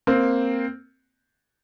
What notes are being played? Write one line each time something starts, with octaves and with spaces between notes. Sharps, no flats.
A#3 C4